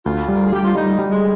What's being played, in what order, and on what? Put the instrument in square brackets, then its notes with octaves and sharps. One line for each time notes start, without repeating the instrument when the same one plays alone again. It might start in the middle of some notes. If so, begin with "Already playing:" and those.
[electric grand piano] D2 [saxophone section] F4
[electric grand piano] G3
[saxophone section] A#4
G#4
[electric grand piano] G3 [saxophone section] G4
[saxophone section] F4
[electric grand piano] G3 [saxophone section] D#4
[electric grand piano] G3
[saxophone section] G#3